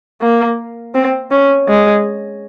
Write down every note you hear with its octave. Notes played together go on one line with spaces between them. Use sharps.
A#3
C4
C#4
G#3